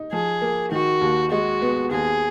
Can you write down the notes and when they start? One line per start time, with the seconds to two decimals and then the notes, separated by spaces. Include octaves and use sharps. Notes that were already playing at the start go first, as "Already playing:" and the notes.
Already playing: D#4
0.12 F3 G#4
0.41 A#3
0.71 D#3 F#4
1.01 D#2
1.31 G#3 F#4
1.62 B3
1.91 D#2 G#4